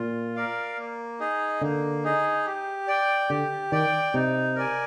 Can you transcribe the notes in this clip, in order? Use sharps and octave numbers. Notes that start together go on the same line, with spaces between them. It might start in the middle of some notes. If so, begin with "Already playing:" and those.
Already playing: A#2 F4
A#4 D5 F5
A#3
D#4 G#4 D#5
D3 A#3
D#4 G#4 D#5
G4
D5 G5
D3 G4
D#3 D5 G5
C3 D#4
A#4 D5 G#5